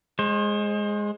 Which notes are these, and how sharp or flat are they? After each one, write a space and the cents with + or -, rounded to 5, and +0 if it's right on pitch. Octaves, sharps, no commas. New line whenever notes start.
G#3 +0 C5 +35